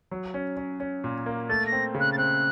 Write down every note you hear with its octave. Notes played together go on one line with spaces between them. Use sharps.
F#3
C#4
C#4
C#4
A#2
A#3
A3 A6
A#6
C4
C#3
F#6
A6
C4 F#6